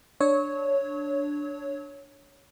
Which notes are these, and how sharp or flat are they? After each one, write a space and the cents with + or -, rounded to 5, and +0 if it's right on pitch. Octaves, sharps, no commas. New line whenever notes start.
D4 +0 C#5 +0 E6 -35